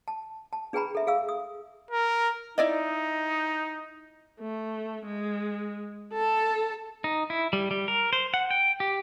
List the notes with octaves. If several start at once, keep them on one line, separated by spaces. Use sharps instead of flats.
A5
A5
D4 G#4 B4 G5 A#5 B5
A4 E5
G#4 F5 E6
D#6
A#4
D#4 E4 D5 D#5
A3
G#3
A4 A5
D#4
E4
G3
G3
A#4
C5
F#5
G5
G4